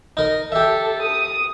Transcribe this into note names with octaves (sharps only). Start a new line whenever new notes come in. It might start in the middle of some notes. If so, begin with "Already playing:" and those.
D#4 A#4
G4 A4 E5
D#6